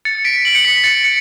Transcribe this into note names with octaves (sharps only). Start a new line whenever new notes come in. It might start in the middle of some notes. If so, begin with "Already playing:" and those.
A6 C#7
B6 D7
D7 F#7
C#7
B6
A6 C#7
C#7